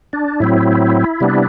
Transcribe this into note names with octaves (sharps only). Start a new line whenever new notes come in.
D4
A2 F#3 C4 E4
C3 G3 B3 D4